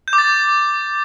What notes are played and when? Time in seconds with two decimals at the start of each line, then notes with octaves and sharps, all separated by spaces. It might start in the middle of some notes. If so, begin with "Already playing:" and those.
0.08 G6
0.13 D6
0.18 A6